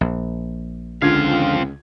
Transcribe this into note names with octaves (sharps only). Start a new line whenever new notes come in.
A#1
C#2 D3 C4 F4 F5 G#6